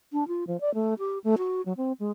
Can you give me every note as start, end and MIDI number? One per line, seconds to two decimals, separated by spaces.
0.13 0.27 62
0.28 0.44 65
0.47 0.60 53
0.61 0.73 74
0.75 0.94 57
0.99 1.19 67
1.24 1.35 57
1.38 1.62 66
1.66 1.73 54
1.77 1.92 60
2.00 2.11 56